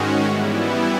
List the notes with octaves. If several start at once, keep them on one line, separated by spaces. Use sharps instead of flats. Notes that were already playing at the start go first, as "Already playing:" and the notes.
Already playing: G#2 D#3 G#3 C#4 F#4
E3 G3 B3 E4